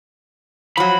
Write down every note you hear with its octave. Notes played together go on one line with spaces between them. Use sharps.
F3 F#3 B5